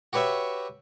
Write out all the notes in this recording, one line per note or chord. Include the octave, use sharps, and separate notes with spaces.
F#4 G4 B4 C#5 E5